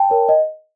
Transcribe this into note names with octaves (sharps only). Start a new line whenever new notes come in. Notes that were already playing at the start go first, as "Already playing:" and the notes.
Already playing: G5 A5
A#4 C#5
D#5